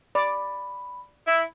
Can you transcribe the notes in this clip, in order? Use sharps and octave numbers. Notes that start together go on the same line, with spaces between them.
D5 B5
E4